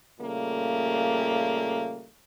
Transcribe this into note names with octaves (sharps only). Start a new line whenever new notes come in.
A#2 C#3 G3 A3 A#3